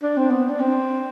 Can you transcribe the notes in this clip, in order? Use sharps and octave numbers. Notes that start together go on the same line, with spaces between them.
D4
C4
B3
D4
C4